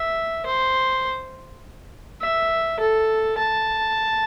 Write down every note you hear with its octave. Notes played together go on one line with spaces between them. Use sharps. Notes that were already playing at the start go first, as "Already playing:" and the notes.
Already playing: E5
C5
E5
A4
A5